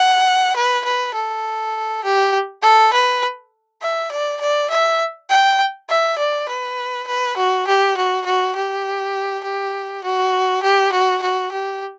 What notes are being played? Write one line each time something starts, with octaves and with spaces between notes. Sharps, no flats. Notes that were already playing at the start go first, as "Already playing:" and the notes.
Already playing: F#5
B4
B4
A4
G4
A4
B4
E5
D5
D5
E5
G5
E5
D5
B4
B4
F#4
G4
F#4
F#4
G4
G4
F#4
G4
F#4
F#4
G4